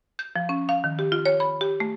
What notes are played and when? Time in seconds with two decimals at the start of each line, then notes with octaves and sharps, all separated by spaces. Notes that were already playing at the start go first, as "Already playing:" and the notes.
0.19 G6
0.36 F3
0.49 C#4
0.69 F5
0.84 D#3
0.99 G4
1.12 F4
1.25 C#5
1.40 B5
1.61 G4
1.80 A3